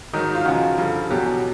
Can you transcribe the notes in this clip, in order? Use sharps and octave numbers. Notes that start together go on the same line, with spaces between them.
G#2 D#3 F#3 D#4
F4
F#2 C#3 F3 F#4
F4
G2 D3 F3
E2 B2 F#3 G4